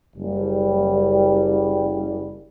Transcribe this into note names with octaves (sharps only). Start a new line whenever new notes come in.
F#1 G3